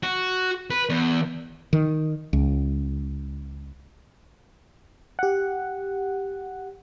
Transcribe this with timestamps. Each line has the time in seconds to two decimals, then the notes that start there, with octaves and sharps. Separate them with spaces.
0.03 F#4
0.70 B4
0.90 E2
1.73 D#3
2.33 C#2
5.19 G4 F#5